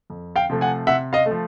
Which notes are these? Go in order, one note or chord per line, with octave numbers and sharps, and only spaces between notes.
F2
F5 G5
C3 F3 A3
F#5 G#5
C3 E5 F#5
D#5 F5
A3
F3